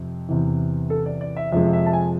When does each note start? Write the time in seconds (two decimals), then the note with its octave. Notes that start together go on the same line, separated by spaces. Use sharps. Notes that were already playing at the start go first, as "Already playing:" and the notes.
Already playing: F2 C3
0.29 E2 C3 E3
0.90 A4
1.06 D5
1.21 D5
1.37 E5
1.52 F2 C3 F3 G#3 E5
1.73 E5
1.86 A5
1.93 G#5